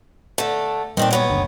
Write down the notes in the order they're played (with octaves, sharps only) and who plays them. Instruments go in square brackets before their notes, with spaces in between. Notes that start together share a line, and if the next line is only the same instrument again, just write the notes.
[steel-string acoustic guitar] D3 A3
[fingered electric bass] A#2 G3 [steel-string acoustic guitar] D#3 C4 D4
[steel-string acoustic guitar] F#3 B3 C#5
[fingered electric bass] F#1 D2 D3